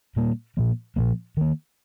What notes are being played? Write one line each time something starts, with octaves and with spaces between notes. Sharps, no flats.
A#2 G3 A#3
A#2 F3 A#3
A#2 F3 A#3
D#3 A#3